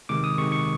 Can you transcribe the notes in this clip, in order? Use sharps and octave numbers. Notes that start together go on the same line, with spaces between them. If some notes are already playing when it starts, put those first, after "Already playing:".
C3 D#3 G#3 D6
D#6
C3 D#3 G#3 C#6
C#6